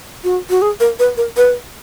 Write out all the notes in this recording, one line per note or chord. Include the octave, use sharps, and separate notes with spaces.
F#4
F#4
G#4
A#4
B4
A#4
B4